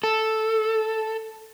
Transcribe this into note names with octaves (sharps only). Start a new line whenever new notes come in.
A4